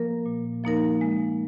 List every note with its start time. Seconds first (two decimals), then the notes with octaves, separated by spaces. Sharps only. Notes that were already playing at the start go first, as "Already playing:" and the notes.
Already playing: F3 A#3 A#4
0.26 A#2
0.64 F3 A#3 D#4 A#4
1.01 G#3